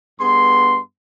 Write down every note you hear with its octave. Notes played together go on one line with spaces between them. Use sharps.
G2 B3 G#4 C6